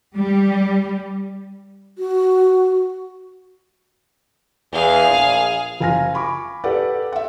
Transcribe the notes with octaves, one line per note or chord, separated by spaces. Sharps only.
G3
F#4
E2 G#4 F5
A#1
F#1 F4 G#5 F6 A#6
G#5 B5 C#6 D6
G4 A4 B4 D5 F#5
E5 F#5